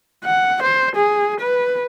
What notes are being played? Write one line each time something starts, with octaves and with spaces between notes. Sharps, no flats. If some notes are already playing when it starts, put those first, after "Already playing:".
F#5
C5
G#4
B4